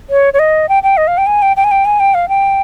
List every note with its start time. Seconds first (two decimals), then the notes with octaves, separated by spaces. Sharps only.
0.10 C#5
0.34 C#5
0.39 D#5
0.69 G5
0.83 G5
0.97 D#5
1.07 F5
1.18 G5
1.27 G#5
1.42 G5
1.57 G5
1.64 G#5
1.71 G5
1.85 G#5
2.00 G5
2.14 F5
2.29 G5